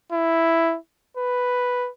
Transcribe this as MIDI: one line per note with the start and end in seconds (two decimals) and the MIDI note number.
0.12 0.76 64
1.17 1.89 71